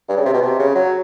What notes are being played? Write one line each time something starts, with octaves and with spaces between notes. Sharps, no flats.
G2
C#3
C3
B2
C3
C#3
F#3